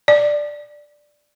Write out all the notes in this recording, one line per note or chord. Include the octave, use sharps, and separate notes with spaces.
D5